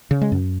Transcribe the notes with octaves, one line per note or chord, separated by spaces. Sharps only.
C#3
G#3
F#2